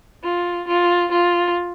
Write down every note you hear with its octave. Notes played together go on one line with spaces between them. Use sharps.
F4
F4
F4